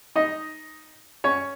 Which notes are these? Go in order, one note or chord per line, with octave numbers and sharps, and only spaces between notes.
D#4 D#5
C#4 C#5